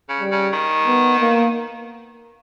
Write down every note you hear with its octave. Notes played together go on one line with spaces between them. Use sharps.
C#3
G3
C#3
D#3
B3
A#3